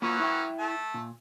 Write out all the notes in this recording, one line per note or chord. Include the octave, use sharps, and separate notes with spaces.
E3 F#3 A#3 C#4 F4
E4 E5 G5
A3 A5
A#2